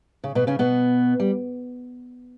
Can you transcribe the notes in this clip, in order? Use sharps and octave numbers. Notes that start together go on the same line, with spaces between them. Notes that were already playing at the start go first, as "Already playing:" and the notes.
C#3
B2 B3
C#3 C#4
B2 B3
G3